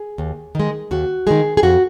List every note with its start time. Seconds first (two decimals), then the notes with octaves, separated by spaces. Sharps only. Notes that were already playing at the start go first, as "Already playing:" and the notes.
Already playing: G#4
0.18 D#2
0.55 D#3 G#3
0.91 D#2 F#4
1.27 D#3 G#3 G#4
1.57 G#4
1.63 F2 F#4